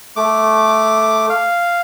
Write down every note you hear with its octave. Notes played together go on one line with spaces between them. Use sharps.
A3 D6
F5